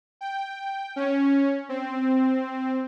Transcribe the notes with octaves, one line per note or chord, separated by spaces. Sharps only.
G5
C#4
C4